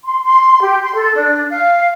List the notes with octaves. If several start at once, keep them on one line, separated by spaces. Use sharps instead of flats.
C6
C6
G4
C6
A4
D4
F5